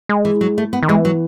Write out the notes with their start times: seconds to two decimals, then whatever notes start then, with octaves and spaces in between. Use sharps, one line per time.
0.09 G#3
0.25 E3
0.41 F#3
0.58 A3
0.73 B3
0.83 D#3
0.88 E3 G#3
1.05 F#3